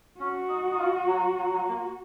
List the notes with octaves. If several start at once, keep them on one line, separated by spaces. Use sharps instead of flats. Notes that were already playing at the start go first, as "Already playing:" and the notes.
C#4 F#4
D#4
D#4
F4
F#3
F#3
F#3
A#3